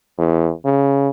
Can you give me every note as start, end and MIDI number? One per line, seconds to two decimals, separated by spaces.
0.18 0.51 40
0.65 1.09 49